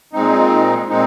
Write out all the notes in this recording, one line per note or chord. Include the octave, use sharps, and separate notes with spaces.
A#2 G#3 C4 D#4
A#2 G#3 C4 D#4